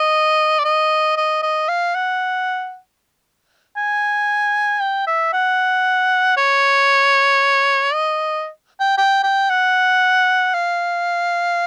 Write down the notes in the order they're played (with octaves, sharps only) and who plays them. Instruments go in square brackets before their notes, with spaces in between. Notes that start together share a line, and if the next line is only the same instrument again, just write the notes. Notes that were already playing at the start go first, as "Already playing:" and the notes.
Already playing: [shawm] D#5
D5
D#5
D#5
D#5
F5
F#5
G#5
G5
E5
F#5
C#5
D#5
G5
G5
G5
F#5
F5